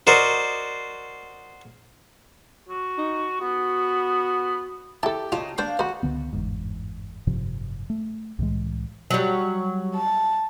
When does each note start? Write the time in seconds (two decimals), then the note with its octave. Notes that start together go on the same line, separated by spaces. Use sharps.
0.07 F#4 A#4 C5 D5 D#5
2.69 F#4
2.98 D#4
3.41 B3 F#4
5.03 E4 G4 A4 A5
5.32 C#3 D#4 F4 A5
5.58 D4 C5 F5 G5 C6
5.79 D3 F#4 C5 B5
6.03 C#2 D3 B3
6.33 G1 E2 G#2
7.27 F#1 G#2 C3 F3
7.90 A3
8.39 C2 A2 E3 G#3
9.10 F#3 G3
9.95 A5